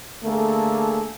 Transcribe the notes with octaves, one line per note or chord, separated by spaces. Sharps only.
D3 A3 A#3 G#4 A4